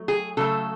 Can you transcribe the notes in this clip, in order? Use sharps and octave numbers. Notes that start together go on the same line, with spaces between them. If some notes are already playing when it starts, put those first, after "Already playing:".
Already playing: F#3 A3
G#4
C#3 F#3 A3 A4